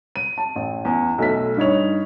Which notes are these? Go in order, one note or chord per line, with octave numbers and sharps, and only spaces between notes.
D#7
A5
A1
E2
B1 A3 B6
G2 D#4 C#5 F7